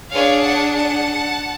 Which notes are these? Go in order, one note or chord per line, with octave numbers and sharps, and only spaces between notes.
D4 G#4 C#5 F5
F#5 A5
F#5 A5